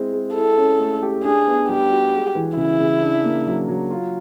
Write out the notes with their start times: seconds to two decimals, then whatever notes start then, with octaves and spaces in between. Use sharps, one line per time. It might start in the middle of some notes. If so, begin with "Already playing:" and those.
Already playing: G#3 C4 E4
0.13 G#3
0.35 E4 A4
0.58 C#4
0.79 A3
1.03 G4
1.24 D4 G#4
1.46 B3
1.68 G3 G4
1.91 F#4
2.14 G#3
2.35 E3
2.57 C#3 E4
2.79 C#3
3.02 D4
3.24 A#3
3.47 F#3
3.68 F#3
3.91 F4